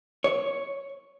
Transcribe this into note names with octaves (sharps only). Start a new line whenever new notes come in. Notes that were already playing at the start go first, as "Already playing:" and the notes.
C#5